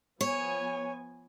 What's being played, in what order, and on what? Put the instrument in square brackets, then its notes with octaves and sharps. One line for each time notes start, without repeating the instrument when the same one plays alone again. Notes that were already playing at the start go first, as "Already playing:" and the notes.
[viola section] F3 B3 G#5 [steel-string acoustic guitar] C#5